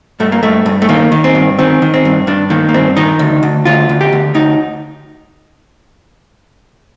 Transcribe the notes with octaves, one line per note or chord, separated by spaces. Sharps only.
G2 A3
A#3
G2 A3
G2
A3
D#3 A#3
D#3
C4
G2
D#3 C4
D#3
C4
G2
G2 D4
D#3 A#3
A#3
G2 C4
D#3 D#4
D2
D2
D2 F4
D2
G4
D2
D2 D#4